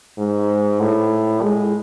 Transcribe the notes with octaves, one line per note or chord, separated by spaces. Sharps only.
G#2
A2
G#3